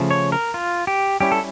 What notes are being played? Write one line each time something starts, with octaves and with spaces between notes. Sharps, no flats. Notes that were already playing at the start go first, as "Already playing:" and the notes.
Already playing: C#3 F3 A3
C#5
A#4
F4
G4
G3 C#4 E4 G4
A4